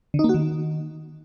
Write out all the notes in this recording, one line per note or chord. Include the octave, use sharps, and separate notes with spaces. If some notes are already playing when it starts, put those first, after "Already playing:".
D3
D#4
A#3
F#4
D#3